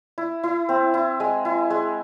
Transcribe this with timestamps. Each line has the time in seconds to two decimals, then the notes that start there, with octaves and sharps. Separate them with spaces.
0.18 E4
0.44 E4
0.69 C4
0.94 E4
1.20 G#3
1.45 E4
1.70 G#3